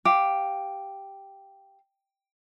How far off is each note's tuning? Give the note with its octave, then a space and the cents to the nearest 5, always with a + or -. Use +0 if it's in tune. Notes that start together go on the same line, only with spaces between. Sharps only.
G4 +0 F5 +0